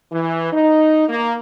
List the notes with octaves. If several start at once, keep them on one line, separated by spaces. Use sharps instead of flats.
E3
D#4
A#3